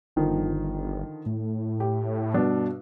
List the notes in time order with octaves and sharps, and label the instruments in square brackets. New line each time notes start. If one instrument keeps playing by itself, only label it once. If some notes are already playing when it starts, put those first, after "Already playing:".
[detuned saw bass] G1 [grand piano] D3 D#3 F3
[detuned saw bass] A2
[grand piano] G4
G2 B2 D4